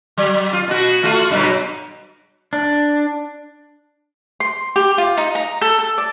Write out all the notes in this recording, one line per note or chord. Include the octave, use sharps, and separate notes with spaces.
F#3
F4
B2 F#4
A3 F4 F#4
G2 B2 F#3
D4
C6
G4
F4
D#4
A#5
A4
A4
D5